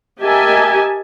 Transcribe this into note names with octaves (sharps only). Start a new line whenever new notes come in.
G4 A#4 D#5 E5 G#5 A5